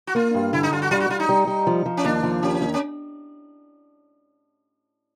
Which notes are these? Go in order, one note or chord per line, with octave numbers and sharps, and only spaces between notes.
F#4
A#3 F4
G2
D3 E4
D#4
G2 F4
F#4
G3 F4
F#4
G3 F4
D#4
G3
G3
F3
F3
C#4
D#2 D4
F3
D#2 C#4
D#2
C#4